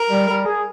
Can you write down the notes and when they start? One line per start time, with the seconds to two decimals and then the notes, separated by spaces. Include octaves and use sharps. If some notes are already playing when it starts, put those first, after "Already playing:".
Already playing: A#4
0.09 G3
0.28 G3
0.45 G#4